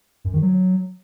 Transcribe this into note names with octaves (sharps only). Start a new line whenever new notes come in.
F#2
D#3
F#3